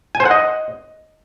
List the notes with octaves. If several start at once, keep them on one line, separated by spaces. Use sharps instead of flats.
G#5
C5
F#5
D#5